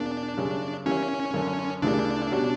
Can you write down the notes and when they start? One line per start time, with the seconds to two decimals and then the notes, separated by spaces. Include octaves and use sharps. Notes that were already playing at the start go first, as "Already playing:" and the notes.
Already playing: E2 B2 A#3 D4
0.37 F#2 C#3 G3 C#4
0.86 E3 G3 A#3 C#4 E4
1.33 F#2 D3 A#3
1.82 D2 C#3 E3 G3 A#3 D4
2.31 B2 G3 C#4 F#4